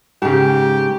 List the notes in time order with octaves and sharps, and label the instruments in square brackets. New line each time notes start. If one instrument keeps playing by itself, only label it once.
[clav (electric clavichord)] G#2 C#3 [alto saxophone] G4